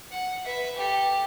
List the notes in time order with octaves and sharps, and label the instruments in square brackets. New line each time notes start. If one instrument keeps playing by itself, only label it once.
[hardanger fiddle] F#5
B4 E5
G4 A4